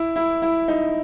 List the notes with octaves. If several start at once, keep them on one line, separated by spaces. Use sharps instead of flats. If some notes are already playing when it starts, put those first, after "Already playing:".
Already playing: E4
E4
E4
D#4